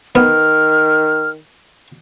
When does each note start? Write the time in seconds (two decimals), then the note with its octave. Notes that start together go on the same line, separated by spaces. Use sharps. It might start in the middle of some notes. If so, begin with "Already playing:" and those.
0.15 D#3 B3 F6